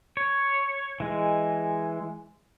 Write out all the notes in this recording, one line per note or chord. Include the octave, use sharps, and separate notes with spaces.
C#5
E3 G#3